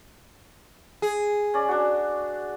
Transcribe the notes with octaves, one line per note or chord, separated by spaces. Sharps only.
G#4
C#4 D5
D4 F#4